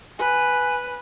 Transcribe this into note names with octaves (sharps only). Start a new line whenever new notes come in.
B4 G#5